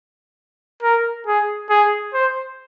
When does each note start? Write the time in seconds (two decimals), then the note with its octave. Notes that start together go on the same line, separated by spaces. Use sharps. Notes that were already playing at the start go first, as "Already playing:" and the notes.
0.83 A#4
1.27 G#4
1.70 G#4
2.14 C5